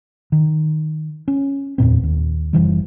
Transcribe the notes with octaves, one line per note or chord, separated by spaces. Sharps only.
D#3
C#4
F#1 E2 A#2 C4
D#2
F#1 D2 E3 G3